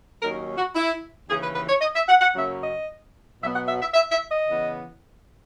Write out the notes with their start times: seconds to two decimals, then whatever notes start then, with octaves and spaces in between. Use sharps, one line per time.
0.22 D#2 D#3 F#3 C#4 A#4
0.58 F#4
0.76 E4
1.29 D#2 C#3 E3 G#4
1.43 B4
1.56 B4
1.69 C#5
1.81 D#5
1.95 E5
2.09 F#5
2.21 F#5
2.36 F#2 C#3 F#3 A#3 C#4 E5
2.62 D#5
3.42 B2 F#3 B3 E5
3.55 F#5
3.68 E5
3.82 E5
3.94 E5
4.12 E5
4.30 D#5
4.47 C#3 E3 B3